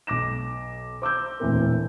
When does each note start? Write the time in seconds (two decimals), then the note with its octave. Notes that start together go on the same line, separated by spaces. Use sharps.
0.07 B1 D6 A#6 E7
1.02 C5 D6 E6 G6
1.40 E1 D2 A#2 E3 C4 A#4